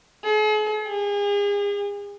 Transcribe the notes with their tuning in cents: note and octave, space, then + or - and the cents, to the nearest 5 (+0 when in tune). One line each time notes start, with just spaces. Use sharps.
G#4 +45
G#4 -35